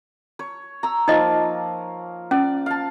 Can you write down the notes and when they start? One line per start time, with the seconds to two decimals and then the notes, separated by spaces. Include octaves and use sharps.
0.39 C#5
0.83 A#5 E6
1.08 F3 A#3 D#4 D#5
2.31 C#4 D5
2.66 F5 A5